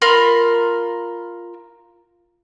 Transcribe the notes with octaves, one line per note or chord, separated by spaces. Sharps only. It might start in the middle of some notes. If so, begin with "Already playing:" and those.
F4 A#4 B5 C6